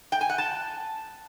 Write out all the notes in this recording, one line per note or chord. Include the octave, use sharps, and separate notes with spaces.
G5
G#5
F#5
A5